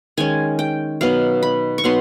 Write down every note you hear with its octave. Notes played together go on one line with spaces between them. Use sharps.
D#3 G#3 C#4 G#5
G5
B2 F#3 B3 D#4 F5
B5
C#6
B2 F#3 B3 D#4 C6